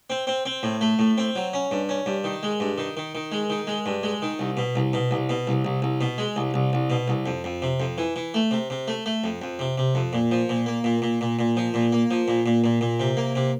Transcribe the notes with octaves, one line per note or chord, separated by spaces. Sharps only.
C4
C4
C4
A2
A3
A2
C4
F#3
C#4
G2
C#4
G2
D#3
G#3
G2
D#3
D#3
D#3
G#3
D#3
G#3
G2
G#3
D#3
C2
B2
C2
B2
C2
B2
C2
C2
C2
B2
G#3
C2
C2
C2
B2
C2
F2
F2
C3
F2
E3
E3
A3
C3
C3
A3
A3
F2
F2
C3
C3
F2
A#2
F3
A#2
A#3
A#2
A#2
A#2
A#2
F3
A#2
A#3
F3
A#2
A#2
A#2
A#2
C3
A#3
C3